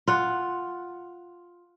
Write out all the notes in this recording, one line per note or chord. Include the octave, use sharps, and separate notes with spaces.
F4 F#5